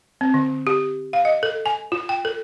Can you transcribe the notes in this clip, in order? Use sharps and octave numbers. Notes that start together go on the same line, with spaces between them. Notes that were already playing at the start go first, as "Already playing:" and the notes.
C4
D3
G4
F5
D#5
A4
G#5
F4
G5
A4